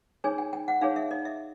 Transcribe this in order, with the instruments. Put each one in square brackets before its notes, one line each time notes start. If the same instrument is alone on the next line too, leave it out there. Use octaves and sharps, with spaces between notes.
[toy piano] D#4 G#4 C#5 G#5
G5
G5
F#5
D#4 G#4 C#5 F5
E5
D#5
E5